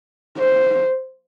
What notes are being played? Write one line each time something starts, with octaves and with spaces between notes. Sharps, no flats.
C5